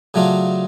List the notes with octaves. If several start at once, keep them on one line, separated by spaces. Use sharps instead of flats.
C#3 F#3 A3 D4 F4